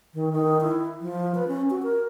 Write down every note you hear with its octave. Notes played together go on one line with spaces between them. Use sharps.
D#3
D#3
E4
F3
B4
C#4
F#4
A#4